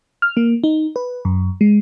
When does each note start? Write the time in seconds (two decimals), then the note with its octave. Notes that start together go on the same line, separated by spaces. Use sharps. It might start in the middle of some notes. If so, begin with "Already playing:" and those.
0.22 F6
0.37 A#3
0.64 D#4
0.96 B4
1.25 F#2
1.61 G#3